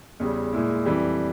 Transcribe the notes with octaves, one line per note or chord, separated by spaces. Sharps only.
E2 C#3 G3
A#2 G#3 E4
F2 E3 G3